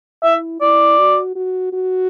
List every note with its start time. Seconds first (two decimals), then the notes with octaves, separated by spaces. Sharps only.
0.23 E4 E5
0.61 E4 D5
0.99 F#4
1.36 F#4
1.73 F#4